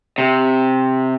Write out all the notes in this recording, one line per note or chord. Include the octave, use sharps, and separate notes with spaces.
C3